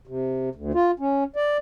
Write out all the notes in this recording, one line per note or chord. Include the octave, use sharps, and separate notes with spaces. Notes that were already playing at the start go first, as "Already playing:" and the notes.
C3
D2
F4
C#4
D5